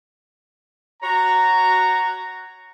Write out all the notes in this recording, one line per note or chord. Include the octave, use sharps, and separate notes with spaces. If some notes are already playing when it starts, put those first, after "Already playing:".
F#4 C#5 A#5